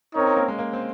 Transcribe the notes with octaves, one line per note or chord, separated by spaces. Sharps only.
C4 C#4 D#4 A#4 C#5
C#4
A#3
G#3
A#3
C4